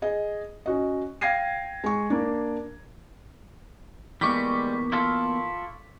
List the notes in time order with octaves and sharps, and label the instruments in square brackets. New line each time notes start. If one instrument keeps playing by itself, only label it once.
[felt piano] G#4 D#5
C#4 F#4 D#5
F5 G5 G#6 A#6 C7 D#7
G#3 C#6
A#3 D4
[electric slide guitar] E3 A#3 B3 [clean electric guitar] G3 G#3 [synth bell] C#6 D6 B6
[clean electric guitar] E4 F4 A4